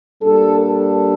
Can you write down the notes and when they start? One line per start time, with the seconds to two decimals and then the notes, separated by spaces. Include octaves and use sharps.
0.22 A#2 G3 D4 A4
0.60 A4